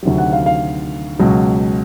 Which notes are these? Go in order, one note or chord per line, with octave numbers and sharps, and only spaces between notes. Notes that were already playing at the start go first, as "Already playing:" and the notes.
D2 C3 D#3 F#3
F#5
F5
F5
C#2 B2 F#3